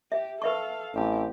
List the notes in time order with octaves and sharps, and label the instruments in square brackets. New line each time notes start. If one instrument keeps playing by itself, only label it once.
[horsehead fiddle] G4 [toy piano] E5
[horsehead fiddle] A4 F5 [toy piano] B4 E5 C#6
[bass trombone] A1 [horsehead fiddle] C4 G4